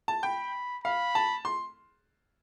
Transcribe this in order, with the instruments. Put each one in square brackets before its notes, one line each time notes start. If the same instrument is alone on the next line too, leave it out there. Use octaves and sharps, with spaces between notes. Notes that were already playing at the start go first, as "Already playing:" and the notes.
[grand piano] A5
[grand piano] G5 [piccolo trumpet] B5
[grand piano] F5 [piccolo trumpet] B5
[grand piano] A5
C6